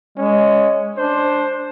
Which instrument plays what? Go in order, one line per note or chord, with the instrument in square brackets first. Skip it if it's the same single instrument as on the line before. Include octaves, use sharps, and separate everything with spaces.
[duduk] G#3 [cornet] C#4
[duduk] D4 [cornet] C5